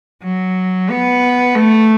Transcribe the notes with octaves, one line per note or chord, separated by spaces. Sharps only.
F#3
B3
A3